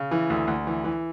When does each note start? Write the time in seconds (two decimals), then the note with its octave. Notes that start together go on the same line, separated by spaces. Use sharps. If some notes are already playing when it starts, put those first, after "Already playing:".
Already playing: C#3
0.11 E3
0.30 D2
0.47 D2
0.67 E3
0.84 E3